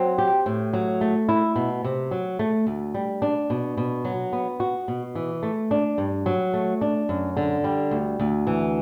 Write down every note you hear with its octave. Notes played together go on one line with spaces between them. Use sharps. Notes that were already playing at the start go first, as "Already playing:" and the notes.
Already playing: F#3 C4
G4
A2
F#3
A3
E4
B2
C3
F#3
A3
D2
G3
D4
B2
B2
F#3
B3
F#4
B2
E3
A3
D4
G2
F#3
A3
D4
F#2
D3
G3
D2
D2
E3